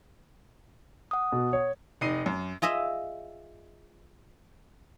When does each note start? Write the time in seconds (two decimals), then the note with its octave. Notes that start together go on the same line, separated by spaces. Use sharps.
1.11 F#5 D#6
1.32 B2
1.53 C#5
2.01 F1 D#4 C7 D#7
2.26 F#2
2.62 F4 G#4 D#5 E5